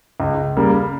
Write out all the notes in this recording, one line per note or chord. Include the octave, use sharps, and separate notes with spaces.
C#2
C#3 G3 A#3